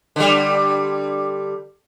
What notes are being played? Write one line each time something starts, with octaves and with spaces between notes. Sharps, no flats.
D3 G3